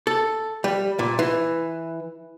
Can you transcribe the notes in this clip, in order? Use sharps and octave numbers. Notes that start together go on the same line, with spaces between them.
A4
G3
A#2
E3